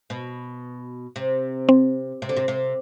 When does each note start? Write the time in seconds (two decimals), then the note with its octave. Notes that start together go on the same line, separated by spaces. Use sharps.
0.10 B2
1.16 C3
1.69 C4
2.22 C3
2.29 D3
2.37 C3
2.48 C3